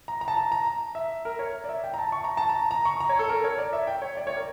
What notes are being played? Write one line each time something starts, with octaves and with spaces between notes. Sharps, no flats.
A#5
A#5
A5
A#5
A#5
E5
A#4
C#5
D5
E5
G5
A#5
A5
C#6
A#5
A5
A#5
A#5
C#6
A#5
C#5
A4
A#4
C#5
D5
E5
G5
C#5
D5
C#5
A#4